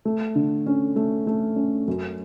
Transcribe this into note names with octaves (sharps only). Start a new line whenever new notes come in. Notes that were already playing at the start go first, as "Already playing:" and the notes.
A3
D3
C#4
A3
A3
C#4
F#2